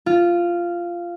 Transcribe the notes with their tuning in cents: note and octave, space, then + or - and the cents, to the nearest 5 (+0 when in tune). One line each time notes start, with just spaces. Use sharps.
F4 -10